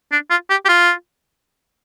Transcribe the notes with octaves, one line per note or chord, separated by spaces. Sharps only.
D4
F4
G4
G4
F4